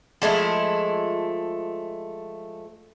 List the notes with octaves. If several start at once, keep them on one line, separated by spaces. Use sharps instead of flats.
F3 G#3 A3 E4